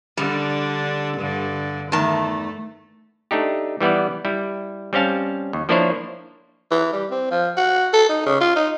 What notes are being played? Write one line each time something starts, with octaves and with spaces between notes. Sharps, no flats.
D3 G3 D4
G2 D3
E2 D#3 A3 A5
A3 D4 D#4 G4
E3 G3 B3 E4 D5
G3 E4
G3 C4 C#4 F5 A5
D#2
F3 A#3 D4 E4 C5 C#5
E3
G3
C4
F3
F#4
A4
D#4
C#3
F4
D#4